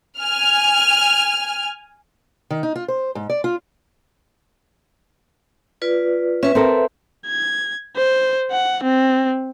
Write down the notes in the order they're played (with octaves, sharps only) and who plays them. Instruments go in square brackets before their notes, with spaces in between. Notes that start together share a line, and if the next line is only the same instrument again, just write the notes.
[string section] G#5 F6
[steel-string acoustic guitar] D#3
D#4
F4
C5
G#2
D5
F4
[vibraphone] F4 B4 D5
[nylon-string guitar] C#4 [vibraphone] B4 E5
[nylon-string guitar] C4 A4 A#4
[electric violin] G#6
C5
F#5
C4